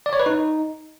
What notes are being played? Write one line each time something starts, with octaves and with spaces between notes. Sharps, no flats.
D5
C#5
B4
D#4